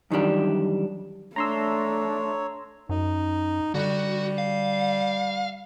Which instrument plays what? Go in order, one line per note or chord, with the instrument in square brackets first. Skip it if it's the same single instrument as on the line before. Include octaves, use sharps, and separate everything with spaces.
[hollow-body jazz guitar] F#2 D#3 E3 G3 D4
[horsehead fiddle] A3 [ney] D4 [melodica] C#5 [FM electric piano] A#5 C6 E6
[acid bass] F#2 [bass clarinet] D#4
[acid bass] D3 [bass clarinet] G3 [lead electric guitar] F#4
[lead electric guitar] F5